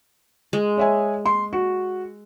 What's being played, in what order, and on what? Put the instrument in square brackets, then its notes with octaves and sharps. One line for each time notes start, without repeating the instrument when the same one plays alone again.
[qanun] G#3
[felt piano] C#5 E5 G#5
C6
F#4